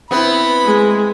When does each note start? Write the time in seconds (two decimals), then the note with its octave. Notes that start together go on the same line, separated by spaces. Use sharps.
0.11 B3 C4 E4 B5
0.64 G#3